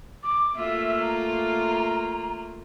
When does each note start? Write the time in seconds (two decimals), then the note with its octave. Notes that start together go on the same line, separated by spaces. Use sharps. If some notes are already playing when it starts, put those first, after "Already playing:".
0.23 D6
0.55 A3 A#3 F4 E5
1.01 A#5